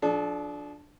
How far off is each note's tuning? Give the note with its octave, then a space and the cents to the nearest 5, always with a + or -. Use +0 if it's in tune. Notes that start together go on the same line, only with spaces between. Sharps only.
F3 +20 D4 +0 A4 -40